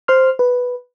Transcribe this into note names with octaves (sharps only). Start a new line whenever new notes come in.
C5 C6 F6
B4